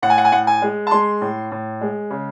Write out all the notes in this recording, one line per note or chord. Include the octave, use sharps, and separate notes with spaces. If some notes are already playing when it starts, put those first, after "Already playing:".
A2 F#5
G#5
F#5
G#5
A2 F#5
G#5
G#3
A5
G#3 C6
A2
A2
G#3
C#3